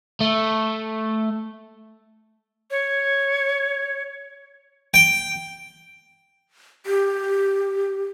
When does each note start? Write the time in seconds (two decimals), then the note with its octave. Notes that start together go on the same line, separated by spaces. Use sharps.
0.20 A3
2.71 C#5
4.94 G5
6.86 G4